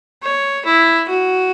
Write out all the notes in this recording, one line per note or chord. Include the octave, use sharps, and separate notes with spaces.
C#5
E4
F#4